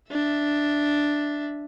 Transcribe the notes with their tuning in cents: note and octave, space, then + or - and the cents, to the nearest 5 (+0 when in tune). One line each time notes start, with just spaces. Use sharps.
D4 +0 E5 +0